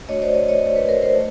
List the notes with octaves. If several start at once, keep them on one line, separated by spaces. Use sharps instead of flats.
A3 D4 F#4 C#5 D#5
C5 D5
C#5 D#5
C#5 D#5
B4 C#5
A#4 C5
A#4 C5
A3